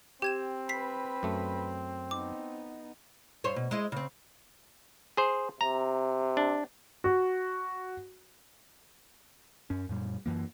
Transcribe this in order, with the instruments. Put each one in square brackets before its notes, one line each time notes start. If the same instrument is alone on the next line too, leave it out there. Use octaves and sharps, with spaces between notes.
[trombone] C4 [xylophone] G4 G#6 E7 [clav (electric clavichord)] G5
[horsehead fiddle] B4 B5 [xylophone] B6 C7
[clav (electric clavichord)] F#2 A3
[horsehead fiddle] B3 D#4 [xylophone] D6
[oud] G2 C5 C#5
B2
G#3 E4 D#5
C#3 C4
[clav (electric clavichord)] G#4 C5
[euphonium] C3 [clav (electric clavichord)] A#5
[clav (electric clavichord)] D4
[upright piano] F#4
[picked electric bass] F#2 C#4
F#2 A#2 G3
F#2 E3 A#3